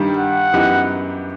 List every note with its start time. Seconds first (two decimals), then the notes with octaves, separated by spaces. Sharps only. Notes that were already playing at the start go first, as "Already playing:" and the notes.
Already playing: G2 D#3 G3
0.17 F#5
0.53 F#2 E3 B3 D#4 G4